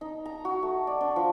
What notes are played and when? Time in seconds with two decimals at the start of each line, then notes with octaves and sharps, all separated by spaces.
0.01 D#4
0.25 A#5
0.45 F#4
0.63 A3
0.87 D5
1.01 D4
1.16 F3